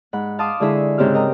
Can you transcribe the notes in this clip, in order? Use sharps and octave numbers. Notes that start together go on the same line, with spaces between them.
G#2 F#5 B5
F5 A5 C6 D6 D#6
D3 G#3 E4 G#4 E5 C#6
G#2 C#3 C4 G4 E6 F6
A#4 D#5 G5 A#5